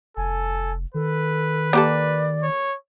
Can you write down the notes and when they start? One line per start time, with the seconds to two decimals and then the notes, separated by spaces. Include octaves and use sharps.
0.17 F1 A4 G#5
0.94 D#3 A4 B4
1.73 A#3 G4 A4 D5
2.43 C#5